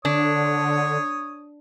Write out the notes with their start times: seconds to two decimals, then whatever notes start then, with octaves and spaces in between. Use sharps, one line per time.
0.05 D3 D4 C#5 D#6